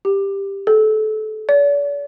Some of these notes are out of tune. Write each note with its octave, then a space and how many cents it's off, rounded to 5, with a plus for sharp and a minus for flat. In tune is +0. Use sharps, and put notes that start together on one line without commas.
G4 +10
A4 -30
D5 -45